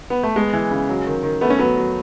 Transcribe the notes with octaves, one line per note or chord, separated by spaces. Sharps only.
B3
A3
G#3 B3
E3
C#3
F#3
D#3
D#3
A3 B3
C#4
F#3 B3
F#3